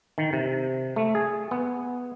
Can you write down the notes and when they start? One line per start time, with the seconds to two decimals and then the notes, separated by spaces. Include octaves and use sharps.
0.18 D#3
0.33 C3
0.96 A3
1.15 G#4
1.51 B3